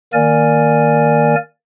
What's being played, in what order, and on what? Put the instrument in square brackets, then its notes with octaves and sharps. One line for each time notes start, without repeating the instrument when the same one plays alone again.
[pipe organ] D#3 A#3 A#4 D5 G#5